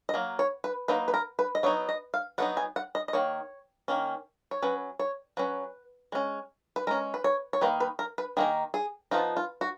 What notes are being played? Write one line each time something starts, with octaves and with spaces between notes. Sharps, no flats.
D#5
F#3 A#3
C#5
B4
F#3 A#3 D#4 B4
B4
A#4
B4
D#5
F#3 B3 D#4 C#5
D#5
F5
F#3 B3 D#4 F#5
G#5
F#5
D#5
D#5
D#3 A#3 C#5
D#3 A#3 C#4
C#5
F#3 C#4 B4
C#5
F#3 C#4 B4
G#3 C#4
B4
G#3 C#4 A#4
B4
C#5
C#5
D#3 A#3 D#4 B4
B4
A#4
B4
D#3 A#3 D#4 G#4
G#4
F3 B3 D#4 F4
F4
F#4